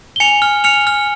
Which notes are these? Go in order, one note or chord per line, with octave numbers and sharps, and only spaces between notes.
G7
G#5 C#7 F7
F6
F6 C#7 F7
F6